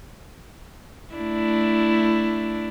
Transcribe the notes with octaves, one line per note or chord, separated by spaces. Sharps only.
A3 D4 E4